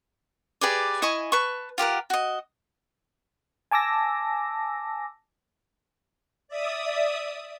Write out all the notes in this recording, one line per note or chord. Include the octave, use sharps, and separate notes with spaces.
G4 G#4 B4 D5
E4 D#5 G#5 C#6
B4 A5 C#6
F4 G4 A#4 F#5
F#4 D#5
G#5 A5 D6 E6 A#6
D5 E5 D#6